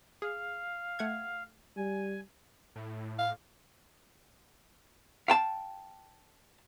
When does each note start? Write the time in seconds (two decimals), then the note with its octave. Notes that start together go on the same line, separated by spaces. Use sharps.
0.22 G#4 F5
0.99 A3 F#5 G#6
1.77 G3 G#5
2.76 A2
3.19 F5
5.28 F5 G5 A5